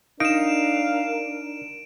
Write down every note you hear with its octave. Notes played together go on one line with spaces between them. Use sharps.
D4 D#4 A#4 F5 D7 E7